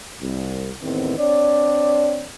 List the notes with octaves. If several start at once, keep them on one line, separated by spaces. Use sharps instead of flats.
C2
E2 A2 D#3 B3 C4
C4 D4 C#5 D5